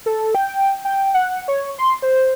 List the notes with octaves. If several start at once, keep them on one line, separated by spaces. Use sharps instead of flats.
A4
G5
G5
F#5
C#5
C6
C5